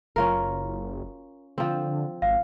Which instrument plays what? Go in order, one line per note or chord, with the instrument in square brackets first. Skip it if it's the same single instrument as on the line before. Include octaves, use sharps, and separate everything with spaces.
[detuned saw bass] F#1 [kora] C#4 F4 A#4
[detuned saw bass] D3 [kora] F3 C4
[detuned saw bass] G#1 [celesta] F5